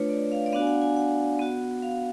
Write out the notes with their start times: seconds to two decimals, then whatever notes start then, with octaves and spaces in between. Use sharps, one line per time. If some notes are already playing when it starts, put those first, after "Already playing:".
Already playing: A3 D4 F4 B4 C#5
0.09 D5
0.32 F5
0.46 D5
0.52 B3 D4 F#4 F5
0.61 G#5
0.67 F#5
0.82 G#5
0.97 F#5
1.39 B3 F#4
1.82 F5